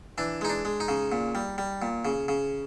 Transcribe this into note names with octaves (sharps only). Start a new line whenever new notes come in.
E3 D4
G#3 D#4
D4
G#3
D#4
C#3
A#2
G3
G3
A#2
C#3
C#3